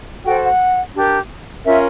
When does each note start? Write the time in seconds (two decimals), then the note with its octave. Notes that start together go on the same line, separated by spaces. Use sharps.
0.24 F#4 A4 C5 G5
0.42 F#5
0.94 D4 G4 A#4
1.64 C#4 F4 A#4 C#5 E5